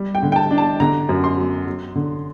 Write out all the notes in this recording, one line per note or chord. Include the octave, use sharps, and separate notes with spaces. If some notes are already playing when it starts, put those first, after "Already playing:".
Already playing: G3
G5
D3
G5
A5
D4
A5
D3 A#5
F#2
C6
F#3
F#3
D3